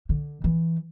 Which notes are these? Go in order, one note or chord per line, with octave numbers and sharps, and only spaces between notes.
D3
E3